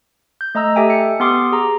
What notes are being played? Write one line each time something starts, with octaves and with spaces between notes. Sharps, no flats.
G6
A3 D#5 A#5 E6
G4 A4 E5 G5 G#5
C#7
B3 G4 C6 D6 D#6 C7
G#4 A#5